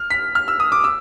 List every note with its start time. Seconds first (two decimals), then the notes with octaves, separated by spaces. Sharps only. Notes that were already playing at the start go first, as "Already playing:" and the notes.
Already playing: F6
0.10 B6
0.35 F6
0.48 E6
0.60 D#6
0.72 D6
0.84 E6